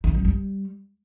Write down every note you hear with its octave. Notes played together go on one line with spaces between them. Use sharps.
D#3
F#2
G3